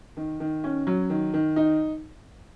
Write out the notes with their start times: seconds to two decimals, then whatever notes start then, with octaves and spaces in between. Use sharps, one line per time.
0.17 D#3
0.40 D#3
0.64 C#4
0.87 F#3
1.10 D#3
1.34 D#3
1.56 D#4